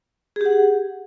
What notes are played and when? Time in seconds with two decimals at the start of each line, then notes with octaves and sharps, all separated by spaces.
0.36 G#4
0.41 G4
0.46 F#5